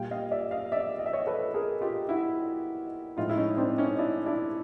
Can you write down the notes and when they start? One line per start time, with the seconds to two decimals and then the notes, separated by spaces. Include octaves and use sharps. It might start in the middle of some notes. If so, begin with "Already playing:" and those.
Already playing: A#2 G3 F5 G5
0.11 D#5 F5
0.31 D5 E5
0.51 D#5 F5
0.72 D5 E5
0.99 D#5
1.06 E5
1.13 C#5 D#5
1.27 A4 B4
1.54 G#4 A#4
1.81 F4 G4
2.08 E4 F#4
3.17 A2 F3 G#3 D#4 F4
3.29 E4
3.37 C#4 D#4
3.57 C4 D4
3.78 C#4 D#4
3.99 D4 E4
4.26 D4 E4